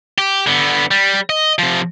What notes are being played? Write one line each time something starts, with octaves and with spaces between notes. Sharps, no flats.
G4
D3 B3
G3
D#5
C3 F3